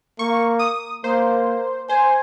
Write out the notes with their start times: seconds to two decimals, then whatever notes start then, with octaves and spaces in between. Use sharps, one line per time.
0.19 A#3 C#6
0.59 D#6
1.04 A#3 C5
1.89 C5 G#5